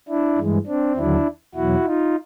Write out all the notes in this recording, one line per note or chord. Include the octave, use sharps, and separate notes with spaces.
D4 E4
G2 E3 G#3
C4 D4
D#2 D3 F#3 D4 E4
E2 B2 F#3 E4 F#4
D#4 F4